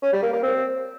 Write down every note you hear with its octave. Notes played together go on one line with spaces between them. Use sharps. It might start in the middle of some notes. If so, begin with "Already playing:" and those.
C#4
G3
A#3
A#3
C4